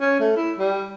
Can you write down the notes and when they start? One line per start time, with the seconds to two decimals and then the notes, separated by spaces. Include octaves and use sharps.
0.01 C#4
0.20 A3
0.36 E4
0.59 G3